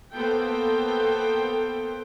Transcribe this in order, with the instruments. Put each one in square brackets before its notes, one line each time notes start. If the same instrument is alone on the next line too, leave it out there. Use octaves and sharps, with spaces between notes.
[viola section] A#3 B3 A4 C5 G5